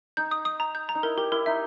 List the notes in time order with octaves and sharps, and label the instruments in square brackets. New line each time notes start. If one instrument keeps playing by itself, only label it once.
[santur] D#4 [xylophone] G6
[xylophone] D#6
D#6
A#5
G6
A#5
[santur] D#4
[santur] E4 [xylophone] A#4
[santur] G4 [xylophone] A#4
[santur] E4 [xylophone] A#4
[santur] D#4 [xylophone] E5